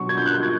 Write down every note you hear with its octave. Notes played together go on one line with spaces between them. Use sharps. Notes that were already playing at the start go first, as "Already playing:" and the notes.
Already playing: B2 F#3 C#6
G#6
G6
F#6
G6
G#6